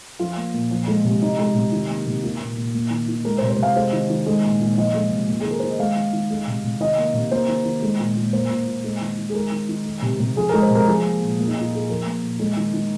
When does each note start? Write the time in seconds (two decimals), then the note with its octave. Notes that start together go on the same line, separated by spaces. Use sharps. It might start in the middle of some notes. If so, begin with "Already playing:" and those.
0.19 F3 F4
0.37 A#3
0.54 A#2
0.71 F3
0.88 G#3
1.04 C3
1.22 F3 D#4
1.39 G#3
1.55 C3
1.72 D#3
1.89 A#3
2.06 C3
2.23 A#3 F4
2.40 A#2
2.57 A#2
2.74 A#3
2.90 D#3
3.08 D#3
3.25 G#3 A#4
3.38 C5
3.42 C3
3.50 C5
3.58 C3 F5
3.76 G#3 C5
3.93 D#3
4.09 D#3
4.27 G#3
4.44 A#2
4.60 A#2
4.77 F3 D#5
4.94 G#3
5.11 C3
5.28 A#3
5.41 G#4
5.46 D#3
5.51 A#4
5.59 D#3 C5
5.70 D#5
5.79 G#3 F5
5.96 D#3
6.13 D#3
6.30 G#3
6.47 C3
6.64 C3
6.80 D#3 D#5
6.98 A#3
7.14 C3
7.31 A#3 C5
7.48 D#3
7.65 D#3
7.82 G#3
7.99 A#2
8.16 A#2
8.33 A#3 C5
8.50 A#2
8.67 A#2
8.84 G#3
9.01 D#3
9.17 D#3
9.29 G#4
9.34 G#3 A#4
9.52 D#3
9.69 D#3
9.85 G#3
10.02 C3
10.20 C3
10.36 F3 G#4
10.49 G#3 A#4
10.62 C5
10.71 C3 A#4
10.87 F3 G#4
11.04 A#3
11.21 A#2
11.39 A#3
11.48 D#4
11.55 A#2
11.61 F4
11.72 A#2 G#4
11.89 F3 A#4
12.06 A#3
12.22 A#2
12.40 G#3
12.57 D#3
12.74 D#3